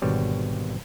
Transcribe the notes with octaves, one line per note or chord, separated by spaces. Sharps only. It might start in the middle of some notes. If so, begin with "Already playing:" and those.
G#1 B2 D3 G3 C#5